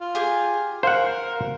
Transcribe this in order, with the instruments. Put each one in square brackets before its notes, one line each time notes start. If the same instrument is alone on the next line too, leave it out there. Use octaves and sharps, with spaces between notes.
[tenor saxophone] F4
[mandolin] G4 G#4
[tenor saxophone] A#4 [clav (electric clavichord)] C5 F#5 [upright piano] F5